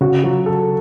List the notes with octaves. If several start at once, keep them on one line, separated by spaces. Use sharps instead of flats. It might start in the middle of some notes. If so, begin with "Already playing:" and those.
C#3 F#4
F#3
A4